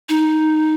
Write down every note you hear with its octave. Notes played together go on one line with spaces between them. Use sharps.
D#4